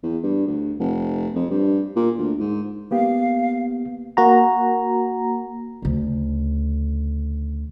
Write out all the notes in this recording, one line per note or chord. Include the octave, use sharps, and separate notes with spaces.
E2
G2
D2
F1
F2
G2
A#2
D2
G#2
A#3 B3 G4 F5
A#3 F#4 A#5
D2 C#3